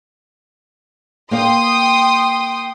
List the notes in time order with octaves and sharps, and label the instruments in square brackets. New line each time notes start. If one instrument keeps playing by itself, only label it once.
[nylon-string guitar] A#3 C5 F5 [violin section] G5 C6 D#6